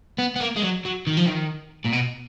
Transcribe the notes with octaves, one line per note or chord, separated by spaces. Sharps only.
B3
B3
A#3
G#3
F#3
F#3
D#3
F3
D#3
A#2
B2